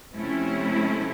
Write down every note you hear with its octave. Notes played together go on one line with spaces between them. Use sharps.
C3 F3 A3 C#4 E4